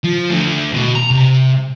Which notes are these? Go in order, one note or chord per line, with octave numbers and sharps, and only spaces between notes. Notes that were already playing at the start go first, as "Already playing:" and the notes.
F3
D3 A3
B2
A#5
C3